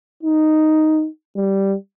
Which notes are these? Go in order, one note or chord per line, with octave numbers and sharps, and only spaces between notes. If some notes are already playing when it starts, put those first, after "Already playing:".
D#4
G3